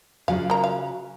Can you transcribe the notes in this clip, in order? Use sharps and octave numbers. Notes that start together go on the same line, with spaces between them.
C#3 F#3 F4 F5
A#3 A#5
F5